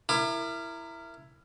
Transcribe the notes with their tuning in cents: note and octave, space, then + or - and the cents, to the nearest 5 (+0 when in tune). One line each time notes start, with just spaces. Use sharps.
E4 +15 A#4 -15 D6 +35